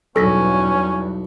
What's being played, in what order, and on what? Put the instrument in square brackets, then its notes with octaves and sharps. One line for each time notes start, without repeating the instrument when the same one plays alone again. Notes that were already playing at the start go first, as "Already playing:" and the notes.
[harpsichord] B1 [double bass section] E2 G2 B2 [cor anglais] C#4 [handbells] A4 A#6 B6